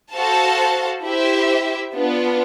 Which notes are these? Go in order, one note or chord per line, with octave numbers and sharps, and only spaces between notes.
F#4 A4 C5 F5 A5
E4 G4 C5 E5
B3 D4 F4